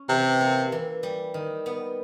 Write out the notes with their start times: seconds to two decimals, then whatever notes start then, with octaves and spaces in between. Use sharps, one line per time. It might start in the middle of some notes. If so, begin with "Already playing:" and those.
Already playing: C#4
0.09 C3 E3
0.41 A#3
0.72 E3
1.03 G3
1.34 D#3
1.66 B3